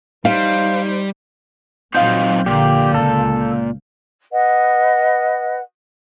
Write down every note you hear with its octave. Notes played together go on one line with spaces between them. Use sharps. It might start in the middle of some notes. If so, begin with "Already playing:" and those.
G3 D#4 C5 F5
A#2 F#3 C4 D#4 F4 F5 G6
A#1 A#2 D3 G4
C#2 A4
B4 D#5 F#5